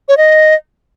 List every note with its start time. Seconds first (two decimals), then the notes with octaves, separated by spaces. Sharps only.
0.08 C#5
0.17 D#5